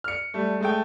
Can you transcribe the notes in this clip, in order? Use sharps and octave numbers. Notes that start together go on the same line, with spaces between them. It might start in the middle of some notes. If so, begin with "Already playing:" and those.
F6 C#7
G3 A3
G#3 A3 G5